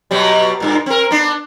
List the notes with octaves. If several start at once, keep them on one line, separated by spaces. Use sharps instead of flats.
B2 F#3 G3
G2 A#2
C4 A#4
B3 D4